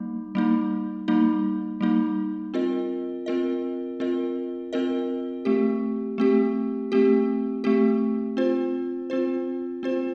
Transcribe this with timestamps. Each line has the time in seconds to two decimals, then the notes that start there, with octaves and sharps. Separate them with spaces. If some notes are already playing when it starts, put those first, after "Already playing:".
Already playing: G3 A#3 D#4
0.35 G3 A#3 D#4
1.08 G3 A#3 D#4
1.81 G3 A#3 D#4
2.54 C4 F4 A#4 D#5
3.26 C4 F4 A#4 D#5
4.00 C4 F4 A#4 D#5
4.73 C4 F4 A#4 D#5
5.45 A3 C4 G4
6.18 A3 C4 G4
6.92 A3 C4 G4
7.64 A3 C4 G4
8.37 C4 F4 C5
9.10 C4 F4 C5
9.83 C4 F4 C5